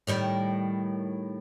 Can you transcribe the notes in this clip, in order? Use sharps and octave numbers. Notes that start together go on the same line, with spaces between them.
A2 D#3 G3